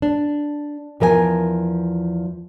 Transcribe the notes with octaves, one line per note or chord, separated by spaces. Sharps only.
D4
E2 F3 A#4 D#5 G#5